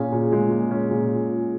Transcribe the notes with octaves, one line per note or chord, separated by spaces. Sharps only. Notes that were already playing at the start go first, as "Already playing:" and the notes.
Already playing: A#2 C#4 F4 G#4
A#2
G#3
A#2
C#4
A#2